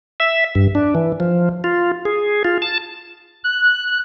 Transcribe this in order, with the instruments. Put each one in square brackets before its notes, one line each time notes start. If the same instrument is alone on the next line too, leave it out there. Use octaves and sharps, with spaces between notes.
[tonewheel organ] E5
G2
D4
E3
F3
F4
G#4
F4
A5
[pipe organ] F#6